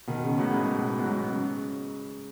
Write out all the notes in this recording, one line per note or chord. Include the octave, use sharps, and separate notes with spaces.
B2 D#3
C#3
A2 F#3 B3
G#2
B2
G#2 F#3 B3
C#3